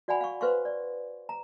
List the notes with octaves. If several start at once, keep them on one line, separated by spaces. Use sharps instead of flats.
F#4 D5 F#5 G#5 B5
F5 C#6
B4 C5 F5 C6 C#6
D5
A#5